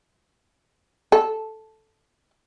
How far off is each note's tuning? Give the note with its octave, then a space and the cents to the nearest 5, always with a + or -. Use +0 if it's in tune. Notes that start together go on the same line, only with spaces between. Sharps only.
A4 -5